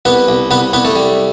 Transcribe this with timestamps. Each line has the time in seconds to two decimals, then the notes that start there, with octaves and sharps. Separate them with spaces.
0.05 C2 B3 B4
0.28 C2
0.51 C2 B3 B4
0.73 C2 B3 B4
0.85 A3 A4
0.96 G3